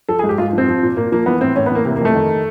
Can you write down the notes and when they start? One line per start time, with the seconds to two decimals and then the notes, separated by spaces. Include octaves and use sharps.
0.09 F3 A4
0.19 G#4
0.23 G#2
0.29 G4
0.38 G#2 F4
0.53 F3 C4
0.68 F3
0.83 A#2
0.97 A#2 A#3
1.12 F3 A#3
1.26 E3 B3
1.41 A2 C4
1.56 A2 C#4
1.66 B3
1.71 E3 A#3
1.85 C3 A#3
1.96 A#3
2.01 F2 A3
2.15 D#3